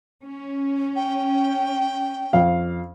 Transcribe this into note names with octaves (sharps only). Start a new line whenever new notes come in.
C#4
G5
F2 F5